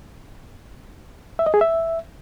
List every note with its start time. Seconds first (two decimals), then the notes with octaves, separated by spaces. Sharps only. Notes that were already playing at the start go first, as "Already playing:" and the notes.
1.39 E5
1.46 D#5
1.54 G#4
1.61 E5